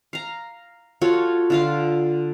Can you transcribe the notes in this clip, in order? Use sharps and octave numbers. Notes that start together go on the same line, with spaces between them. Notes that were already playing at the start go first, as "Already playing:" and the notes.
F5 A#5
F4 F#4 A4 C#5
D3 F4 F5